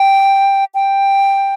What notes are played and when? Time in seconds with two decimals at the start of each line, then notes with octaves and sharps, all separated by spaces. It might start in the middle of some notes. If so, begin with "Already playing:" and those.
Already playing: G5
0.75 G5